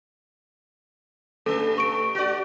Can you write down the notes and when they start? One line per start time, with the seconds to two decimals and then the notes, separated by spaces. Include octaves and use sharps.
1.46 G2 A3 A4
1.78 C#6 D7
2.15 F#4 D5